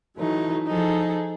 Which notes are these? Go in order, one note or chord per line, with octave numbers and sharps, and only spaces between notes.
E3 F#3 A3 D#4
F3 D#4 G#4 A4